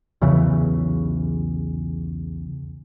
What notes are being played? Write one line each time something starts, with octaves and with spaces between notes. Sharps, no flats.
B1 E2 C#3 E3